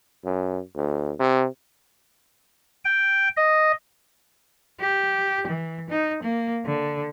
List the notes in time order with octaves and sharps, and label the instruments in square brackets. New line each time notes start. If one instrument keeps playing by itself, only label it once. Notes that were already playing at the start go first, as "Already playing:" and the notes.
[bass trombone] F#2
D2
C3
[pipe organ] G5
D#5
[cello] G4
E3
D#4
A#3
D3